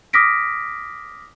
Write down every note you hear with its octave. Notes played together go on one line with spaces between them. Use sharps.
D6 D#6 F6 A#6 B6 D7